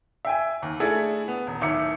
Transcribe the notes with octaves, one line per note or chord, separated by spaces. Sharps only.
E5 G5 G#5
D#2
A3 D4 E4 G#4 A4
B3
D#1
D1 D#3 E5 D6 C#7